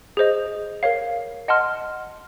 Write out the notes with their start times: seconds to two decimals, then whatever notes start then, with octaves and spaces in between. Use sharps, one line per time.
0.17 G#4 C5 D#5
0.83 A#4 C#5 F5
1.48 D#5 F#5 A5 C6 F6